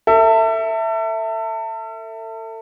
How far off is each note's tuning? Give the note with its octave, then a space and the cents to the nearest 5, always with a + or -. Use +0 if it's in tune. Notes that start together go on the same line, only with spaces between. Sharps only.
A4 +35 E5 +0